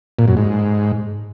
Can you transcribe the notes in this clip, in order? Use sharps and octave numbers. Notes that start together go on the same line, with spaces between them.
A#2
F#2
G#2